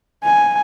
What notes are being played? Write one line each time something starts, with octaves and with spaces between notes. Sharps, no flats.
G#5